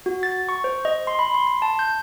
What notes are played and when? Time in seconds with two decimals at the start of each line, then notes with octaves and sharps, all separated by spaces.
0.06 F#4
0.23 A6
0.49 C#6
0.64 C5
0.85 D#5
1.07 C6
1.19 B5
1.34 C6
1.47 C6
1.62 A5
1.79 G6